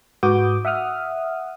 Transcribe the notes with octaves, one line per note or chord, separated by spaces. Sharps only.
G#2 F#4 B4 D6 D#6 G6
E5 F#5 D#6 F6